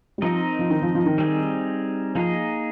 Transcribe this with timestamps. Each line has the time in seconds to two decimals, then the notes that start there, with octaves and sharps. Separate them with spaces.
0.18 G3
0.22 F3 C4 D#4 A#4 D#5
0.59 F3
0.70 D#3
0.82 F3
0.95 F3
1.06 D#3
1.18 G3 C4 D#4 G#4
2.15 F3 A#3 D#4 G#4 D#5